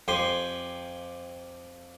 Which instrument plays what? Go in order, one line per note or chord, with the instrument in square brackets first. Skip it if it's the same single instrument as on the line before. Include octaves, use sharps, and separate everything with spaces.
[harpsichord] F2 G4 G#5 C6